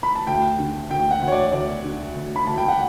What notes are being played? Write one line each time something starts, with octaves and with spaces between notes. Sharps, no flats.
B5
A5
D2 G5
D3
D2 G5
F#5
D2
C#5
D5
D2 D5
D3
D2
B5
D2 A5
G5
F#5